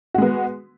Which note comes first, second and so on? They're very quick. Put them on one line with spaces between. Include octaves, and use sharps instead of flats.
F#4 G#3 B3